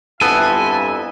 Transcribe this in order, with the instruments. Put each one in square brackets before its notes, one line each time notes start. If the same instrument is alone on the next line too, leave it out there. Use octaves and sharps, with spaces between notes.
[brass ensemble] G1 F2 E5 [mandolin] B3 C4 E4 [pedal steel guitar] A4 [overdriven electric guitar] G#5